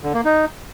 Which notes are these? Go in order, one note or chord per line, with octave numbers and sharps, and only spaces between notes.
D3
A#3
D#4